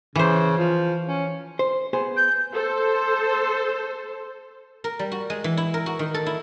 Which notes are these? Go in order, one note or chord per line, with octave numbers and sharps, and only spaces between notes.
C#3 E3 C5
F3
C#4
C5
B3 G#4 C5
G6
A4 C5
A#4
G3
F#4
G#3
E3
E4
A#4
F#4
D#3
A4
E4